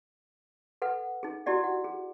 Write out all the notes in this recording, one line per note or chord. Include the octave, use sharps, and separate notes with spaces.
A4 B4 F#5
D#4 G#4
E4 F#4 G4 D5 F#5
F#5
G#4